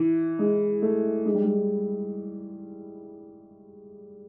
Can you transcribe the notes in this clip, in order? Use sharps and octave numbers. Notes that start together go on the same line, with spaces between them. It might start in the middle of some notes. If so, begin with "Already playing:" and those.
Already playing: E3
G#3
A3
G#3
G3
G#3